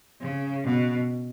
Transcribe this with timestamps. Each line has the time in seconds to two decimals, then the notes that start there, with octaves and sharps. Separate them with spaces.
0.20 C#3
0.63 B2